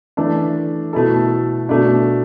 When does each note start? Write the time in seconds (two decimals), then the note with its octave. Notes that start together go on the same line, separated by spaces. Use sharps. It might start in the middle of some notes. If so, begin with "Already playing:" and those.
0.17 E3 A3 D4 A4
0.93 B2 A3 E4 A4
1.69 B2 A3 D4